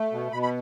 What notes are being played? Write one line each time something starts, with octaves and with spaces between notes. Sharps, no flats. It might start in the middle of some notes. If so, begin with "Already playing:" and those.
Already playing: A3
B2
B2 B5
B5